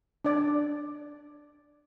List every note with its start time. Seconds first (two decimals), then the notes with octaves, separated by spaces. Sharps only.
0.25 D4 D5